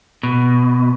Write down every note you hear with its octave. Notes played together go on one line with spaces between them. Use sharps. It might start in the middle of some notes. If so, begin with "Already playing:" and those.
B2